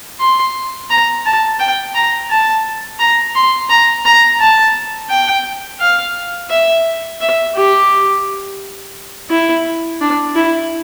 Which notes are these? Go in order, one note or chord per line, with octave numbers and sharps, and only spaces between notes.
C6
A#5
A5
G5
A#5
A5
A#5
C6
A#5
A#5
A5
G5
F5
E5
E5
G4
E4
D4
E4